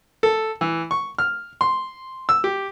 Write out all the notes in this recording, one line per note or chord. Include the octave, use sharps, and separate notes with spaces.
A4
E3
C#6
F6
C6
E6
G4